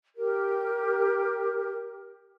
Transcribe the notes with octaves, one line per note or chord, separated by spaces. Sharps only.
G4 A#4